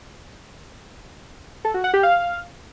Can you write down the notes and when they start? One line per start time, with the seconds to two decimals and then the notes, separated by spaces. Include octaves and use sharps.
1.65 A4
1.74 F#4
1.84 F#5
1.94 G4
2.03 F5